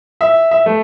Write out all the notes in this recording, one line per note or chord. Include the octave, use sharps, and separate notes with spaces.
E5
E5
A3